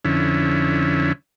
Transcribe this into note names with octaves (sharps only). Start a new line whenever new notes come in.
F2 D3 C#4 E4